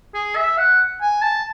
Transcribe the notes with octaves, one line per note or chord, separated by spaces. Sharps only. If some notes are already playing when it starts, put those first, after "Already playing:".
G#4
E5
F#5
G#5
A5